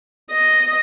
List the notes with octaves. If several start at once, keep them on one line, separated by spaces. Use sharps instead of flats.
D#5